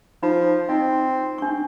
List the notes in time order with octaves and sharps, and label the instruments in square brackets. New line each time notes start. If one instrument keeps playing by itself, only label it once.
[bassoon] F3 [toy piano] D#4 B5
[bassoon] C4 [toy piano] D#4 D#5
[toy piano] D4 C#6